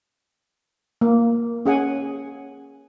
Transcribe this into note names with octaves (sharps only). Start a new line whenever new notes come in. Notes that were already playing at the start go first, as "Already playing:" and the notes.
A#3
C#4 G#4 F#5 G#5